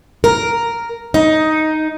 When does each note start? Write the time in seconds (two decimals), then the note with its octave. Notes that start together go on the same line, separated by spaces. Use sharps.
0.24 A#4
1.14 D#4